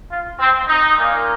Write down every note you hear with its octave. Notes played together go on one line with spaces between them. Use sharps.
F4
C4
D#4
A#2 A#3